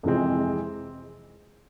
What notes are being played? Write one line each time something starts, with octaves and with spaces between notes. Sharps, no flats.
F2 C3 E3 G#3 C4